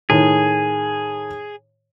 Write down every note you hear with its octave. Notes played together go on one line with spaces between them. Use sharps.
A2 D#3 G#4